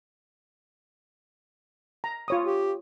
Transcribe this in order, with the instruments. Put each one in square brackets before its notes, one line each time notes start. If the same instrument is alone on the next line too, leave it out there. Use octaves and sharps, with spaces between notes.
[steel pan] A#5
F4 C#5 D#6
[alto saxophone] G4